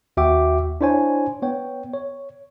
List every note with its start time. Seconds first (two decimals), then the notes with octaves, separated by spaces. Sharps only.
0.17 D#2 F#4 E5 G5 D6
0.81 D4 E4 C5 C#5 G#5
1.42 B3 C#5 G5
1.94 C#5